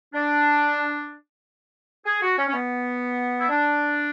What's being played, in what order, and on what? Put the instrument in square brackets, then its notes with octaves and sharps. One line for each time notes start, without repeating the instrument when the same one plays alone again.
[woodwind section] D4
G#4
F#4
C#4
C#4
B3
E4
D4